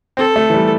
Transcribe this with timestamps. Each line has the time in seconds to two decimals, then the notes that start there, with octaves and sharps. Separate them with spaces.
0.17 C4 A4
0.36 A3
0.50 E3
0.54 G3